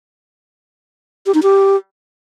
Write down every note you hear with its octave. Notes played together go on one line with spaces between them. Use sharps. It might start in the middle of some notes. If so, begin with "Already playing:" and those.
G4
D#4
G4